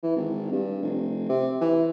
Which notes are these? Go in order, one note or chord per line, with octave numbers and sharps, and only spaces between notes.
E3
G#1
G2
F1
C3
E3